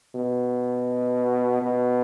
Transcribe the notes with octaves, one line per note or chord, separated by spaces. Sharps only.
B2
B2